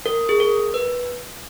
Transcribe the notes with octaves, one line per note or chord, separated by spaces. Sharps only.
A#4
G#4
A#4
B4